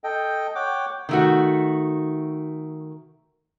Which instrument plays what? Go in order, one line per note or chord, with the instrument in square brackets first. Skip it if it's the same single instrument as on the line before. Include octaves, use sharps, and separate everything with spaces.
[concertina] A4 D#5 G5
C#5 F#5 G5 D6
[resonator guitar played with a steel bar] D#3 A3 F#4